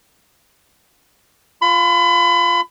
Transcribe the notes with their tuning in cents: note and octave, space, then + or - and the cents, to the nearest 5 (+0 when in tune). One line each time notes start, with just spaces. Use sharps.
F4 +0 B5 +30